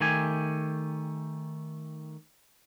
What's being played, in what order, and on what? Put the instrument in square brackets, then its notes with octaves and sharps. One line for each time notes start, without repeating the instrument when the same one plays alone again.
[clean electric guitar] D#3 A3 G4 G#5